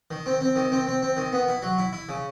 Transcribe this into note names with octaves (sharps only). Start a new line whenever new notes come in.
D#3
C4
C4
D#3
C4
C4
C4
D#3
B3
E4
F#3
E4
E4
C#3